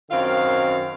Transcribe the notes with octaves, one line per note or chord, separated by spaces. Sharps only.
F#2 D#3 C4 F5